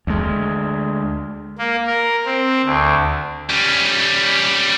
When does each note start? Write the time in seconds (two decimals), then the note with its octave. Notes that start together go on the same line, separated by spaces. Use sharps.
0.07 D2 G#3
1.58 A#3
1.87 A#4
2.26 C4
2.65 D2
3.49 G3 C#4